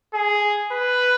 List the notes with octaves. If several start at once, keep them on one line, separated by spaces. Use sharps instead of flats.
G#4
B4